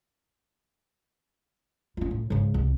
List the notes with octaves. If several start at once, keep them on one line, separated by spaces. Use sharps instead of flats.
C#4 F4
A2
G#2 C#3
C2